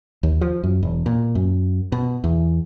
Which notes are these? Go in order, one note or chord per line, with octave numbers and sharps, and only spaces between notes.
D#2
F3
F#2
E1
A#2
F#2
B2
E2